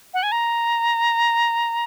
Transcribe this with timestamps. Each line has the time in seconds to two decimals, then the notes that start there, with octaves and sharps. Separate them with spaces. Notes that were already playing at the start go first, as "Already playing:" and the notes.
0.14 F#5
0.23 G#5
0.32 A#5